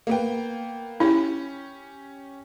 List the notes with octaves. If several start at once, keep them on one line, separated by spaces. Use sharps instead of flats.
A#3 B3 G5
C#4 E4 G4